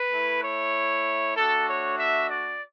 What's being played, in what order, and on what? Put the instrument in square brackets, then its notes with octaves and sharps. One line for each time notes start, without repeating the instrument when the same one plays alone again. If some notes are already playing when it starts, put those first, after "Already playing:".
Already playing: [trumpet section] B4
A3 E4
C#5
A3 D4 F#4 A4
C#5
E5
D5